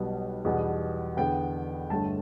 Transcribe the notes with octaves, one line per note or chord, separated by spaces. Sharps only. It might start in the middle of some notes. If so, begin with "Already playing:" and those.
Already playing: B1 B2 G3 B3
E2 B2 G3 B3
E2 D3 B3 G5
G1 G2 D3 A3 A5